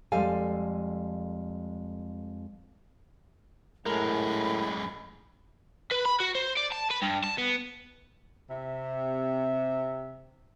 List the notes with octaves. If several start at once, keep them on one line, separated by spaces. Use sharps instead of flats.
F2 G3 G#3 A4 F5 G#5
F#2 A2 G#3 A#4 B5
B4
B5
F#4
C5
D5
A5
B4
G2
A5
B3
C3 E5